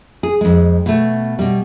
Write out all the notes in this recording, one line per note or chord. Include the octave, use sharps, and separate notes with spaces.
G#4
F2 G#3
B2 A3
B2 G3